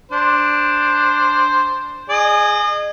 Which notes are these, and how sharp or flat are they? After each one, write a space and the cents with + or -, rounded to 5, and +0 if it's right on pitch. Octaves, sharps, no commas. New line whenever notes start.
D4 +0 C5 +0
G#4 +0 D#5 -35